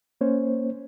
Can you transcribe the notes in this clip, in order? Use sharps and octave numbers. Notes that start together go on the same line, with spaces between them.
A#3 C#4 C5 C#5